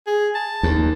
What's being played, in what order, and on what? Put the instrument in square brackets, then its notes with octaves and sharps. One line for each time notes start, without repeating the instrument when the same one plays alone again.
[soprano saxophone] G#4
A5
[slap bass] D#2